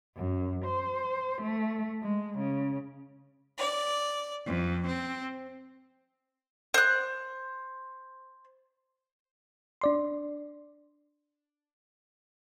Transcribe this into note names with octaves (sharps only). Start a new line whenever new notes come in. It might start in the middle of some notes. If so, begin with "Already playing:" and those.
F#2
C5
A3
G#3
C#3
D5
F2
C4
C5 F#6
D4 D5 C6